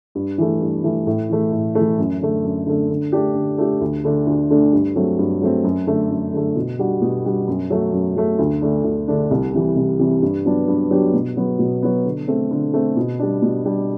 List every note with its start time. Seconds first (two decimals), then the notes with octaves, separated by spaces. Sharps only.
0.15 G2
0.38 E3 A3
0.61 G2
0.84 E3 A3
1.07 A2
1.29 E3 A3
1.52 A2
1.75 E3 A3
1.99 F#2
2.21 D3 A3
2.44 F#2
2.66 D3 A3
2.90 D3
3.12 A3 D4 G4
3.35 D3
3.58 A3 D4 G4
3.81 D2
4.04 D3 A3 D4
4.27 D2
4.50 D3 A3 D4
4.73 G2
4.96 F#3 A3 C4
5.19 G2
5.41 F#3 A3 C4
5.64 F#2
5.87 D3 A3
6.10 F#2
6.33 D3 A3
6.56 B2
6.79 G3 D4 F#4
7.02 B2
7.25 G3 D4 F#4
7.48 F#2
7.70 F#3 A3
7.93 F#2
8.16 F#3 A3
8.39 D2
8.62 D3 A3 D4
8.84 D2
9.08 D3 A3 D4
9.31 C2
9.53 C3 E3 G3
9.76 C2
9.99 C3 E3 G3
10.22 G2
10.45 F#3 B3 D4 G4
10.68 G2
10.91 F#3 B3 D4 G4
11.14 B2
11.37 F#3 B3
11.59 B2
11.82 F#3 B3
12.05 D3
12.28 A3 C4
12.51 D3
12.74 A3 C4
12.97 B2
13.19 G3 D4
13.42 B2
13.65 G3 D4